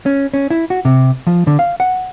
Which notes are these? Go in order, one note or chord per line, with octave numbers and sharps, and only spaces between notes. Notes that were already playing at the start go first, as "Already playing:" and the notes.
C#4
C#4
E4
F#4
C3
F3
D3
F5
F#5